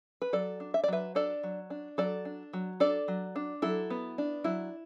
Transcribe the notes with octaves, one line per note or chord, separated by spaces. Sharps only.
B4
F#3 A4 D5
D4
E5
D5
F#3 B4 E5
D4 A4 D5
F#3
D4
F#3 A4 D5
D4
F#3
D4 A4 D5
F#3
D4
F#3 E4 A4
B3
D4
F#3 E4